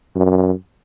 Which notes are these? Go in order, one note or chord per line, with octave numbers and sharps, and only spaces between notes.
F#2